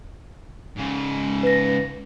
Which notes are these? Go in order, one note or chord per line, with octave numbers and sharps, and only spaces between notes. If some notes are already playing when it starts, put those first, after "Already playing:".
G#2 C#3
B4 A#6